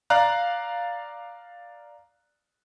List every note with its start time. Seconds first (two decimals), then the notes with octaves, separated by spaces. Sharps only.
0.10 D5 F5 A#5 F#6